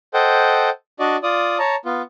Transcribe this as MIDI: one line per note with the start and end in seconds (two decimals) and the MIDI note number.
0.14 0.70 69
0.14 0.70 72
0.14 0.70 75
0.14 0.70 78
0.14 0.70 79
1.00 1.17 62
1.00 1.17 66
1.00 1.17 74
1.00 1.17 75
1.23 1.58 65
1.23 1.58 74
1.23 1.58 87
1.59 1.76 73
1.59 1.76 81
1.59 1.76 82
1.85 2.02 59
1.85 2.02 65